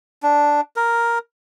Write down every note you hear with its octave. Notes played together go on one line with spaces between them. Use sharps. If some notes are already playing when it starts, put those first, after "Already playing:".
D4
A#4